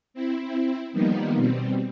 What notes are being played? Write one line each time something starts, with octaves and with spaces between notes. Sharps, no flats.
C4 E4
D#3 F3 G3 A#3 B3 D#4
B2 G3 C4